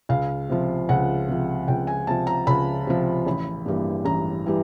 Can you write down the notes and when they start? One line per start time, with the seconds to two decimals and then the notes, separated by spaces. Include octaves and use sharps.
0.09 C#2 F5
0.49 C3 F3
0.89 C#2 F#5
1.29 C3 F3
1.68 C#2 G5
1.87 G#5
2.07 C3 F3 A5
2.27 A#5
2.47 C#2 B5
2.87 C3 F3
3.26 A1
3.66 G2 E3 G3 A#3
4.05 A1 A#5
4.46 E3 G3